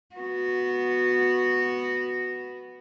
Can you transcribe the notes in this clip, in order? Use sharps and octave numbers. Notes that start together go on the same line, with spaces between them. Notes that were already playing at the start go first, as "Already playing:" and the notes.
B3 F#4